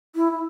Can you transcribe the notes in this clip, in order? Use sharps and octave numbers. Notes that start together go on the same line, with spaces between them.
E4
E4